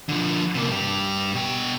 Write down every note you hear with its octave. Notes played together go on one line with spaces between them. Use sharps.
D3 F3
C3 A#3
G2 G4
B2 G5